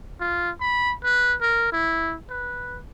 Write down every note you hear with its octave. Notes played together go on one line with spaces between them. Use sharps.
F4
B5
B4
A#4
E4
B4